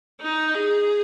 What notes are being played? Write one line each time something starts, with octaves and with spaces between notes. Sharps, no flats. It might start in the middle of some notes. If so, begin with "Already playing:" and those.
D#4
G#4